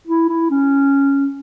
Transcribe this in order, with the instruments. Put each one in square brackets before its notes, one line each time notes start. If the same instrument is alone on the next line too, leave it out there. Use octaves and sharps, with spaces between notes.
[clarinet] E4
E4
C#4